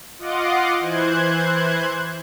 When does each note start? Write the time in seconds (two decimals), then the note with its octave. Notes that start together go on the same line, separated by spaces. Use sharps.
0.18 F4 D#5 F#5 C6 D6
0.80 E3 C5 F#6 G#6